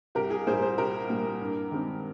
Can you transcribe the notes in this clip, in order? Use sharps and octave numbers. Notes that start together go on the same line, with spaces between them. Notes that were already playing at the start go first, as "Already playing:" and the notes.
C2 G4 A#4
G#4
A#2 G3 A#3 G#4 C5
G#4 C5
C2 G4 A#4
A#2 G3 A#3
G2
D#3 G#3 C4